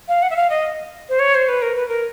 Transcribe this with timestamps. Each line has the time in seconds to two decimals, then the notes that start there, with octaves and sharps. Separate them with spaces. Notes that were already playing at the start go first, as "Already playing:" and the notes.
0.08 F5
0.22 F#5
0.30 E5
0.36 F5
0.50 D#5
1.09 C5
1.19 C#5
1.35 C5
1.49 B4
1.62 A#4
1.76 B4
1.88 A#4